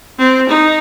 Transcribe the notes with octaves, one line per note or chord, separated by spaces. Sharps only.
C4
D#4